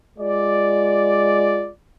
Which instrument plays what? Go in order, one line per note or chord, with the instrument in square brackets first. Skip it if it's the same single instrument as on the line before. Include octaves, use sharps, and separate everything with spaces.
[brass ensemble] G#3 F4 D5